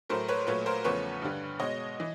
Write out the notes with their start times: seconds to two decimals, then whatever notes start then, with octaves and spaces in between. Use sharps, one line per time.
0.09 A2 F#3 A3 A#4 C5
0.28 B4 C#5
0.47 A#2 F#3 A3 B4 C#5
0.66 A#4 C5
0.84 E2 C#3 F3 A3 B4 C#5
1.22 G2 D3 G3
1.59 B2 G#3 C#5 D#5
2.00 E3